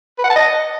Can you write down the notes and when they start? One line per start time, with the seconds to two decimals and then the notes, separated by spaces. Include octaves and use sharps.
0.18 B4
0.24 F#5
0.30 A5
0.36 D#5